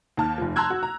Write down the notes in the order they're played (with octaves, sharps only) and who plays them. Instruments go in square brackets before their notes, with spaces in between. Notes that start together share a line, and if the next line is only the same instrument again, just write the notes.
[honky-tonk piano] D#2 A5 F6
F1 F3
A5 A#5 C6 E6 F#6 G#6
F#4
A#5